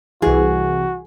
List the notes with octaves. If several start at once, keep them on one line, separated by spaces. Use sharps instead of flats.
C2 E3 F#4 G#4